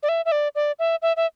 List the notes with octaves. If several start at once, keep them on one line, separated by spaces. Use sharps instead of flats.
D5
E5
E5
D5
D5
E5
E5
E5